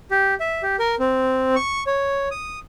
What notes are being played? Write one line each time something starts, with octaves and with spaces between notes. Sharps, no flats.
G4
E5
G4
A#4
C4
C#6
C#5
D#6